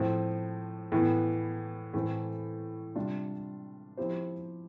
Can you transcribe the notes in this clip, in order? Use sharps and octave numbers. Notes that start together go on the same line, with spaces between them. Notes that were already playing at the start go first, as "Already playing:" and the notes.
Already playing: A2 F3 C4
A2 E3 B3
A2 E3 A3 C4
C3 G3 D4 F4
F3 C4 E4 G4 C5